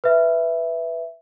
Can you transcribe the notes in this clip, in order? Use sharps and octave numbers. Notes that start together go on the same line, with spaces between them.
B4 E5